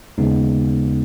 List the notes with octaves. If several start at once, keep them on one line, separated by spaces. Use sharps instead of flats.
D#2 C#3 G#3 B3 D#4